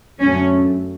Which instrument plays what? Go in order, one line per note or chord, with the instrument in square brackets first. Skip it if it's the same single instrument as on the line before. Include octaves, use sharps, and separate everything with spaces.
[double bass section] F#2 D3 F#3 A3 [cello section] C#4